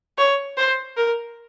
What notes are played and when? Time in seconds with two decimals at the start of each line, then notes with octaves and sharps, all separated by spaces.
0.18 C#5
0.57 C5
0.97 A#4